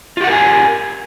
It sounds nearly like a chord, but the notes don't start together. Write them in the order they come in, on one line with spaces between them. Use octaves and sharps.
F4 G4 F#5 A#4 G#5